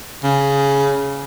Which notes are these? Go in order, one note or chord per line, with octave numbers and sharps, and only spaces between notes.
C#3